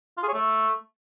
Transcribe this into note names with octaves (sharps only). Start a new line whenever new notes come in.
F4
G#4
C#5
A3